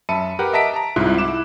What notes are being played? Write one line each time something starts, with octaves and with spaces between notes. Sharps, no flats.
F#2 E5 A5 B5 C#7 D#7
G4 A#4 B4 F#5 D6
D#5 E5 A5 A#5 B6 D7
A5 A#5
C2 G#2 E4 F4 F#6
E4 D6 E7